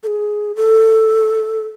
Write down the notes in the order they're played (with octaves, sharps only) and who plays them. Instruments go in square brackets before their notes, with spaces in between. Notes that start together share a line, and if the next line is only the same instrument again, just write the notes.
[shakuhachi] A4
G#4
A4